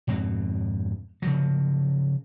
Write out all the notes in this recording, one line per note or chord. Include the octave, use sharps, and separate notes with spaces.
F2 G#2 B2 C4
C#3 F3 F#3